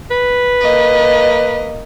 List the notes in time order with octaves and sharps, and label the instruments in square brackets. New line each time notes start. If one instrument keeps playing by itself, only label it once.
[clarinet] B4
[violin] A#3 D#5